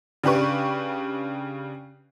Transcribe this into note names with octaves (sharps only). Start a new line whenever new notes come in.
C#3 D4 G4 B4 C#6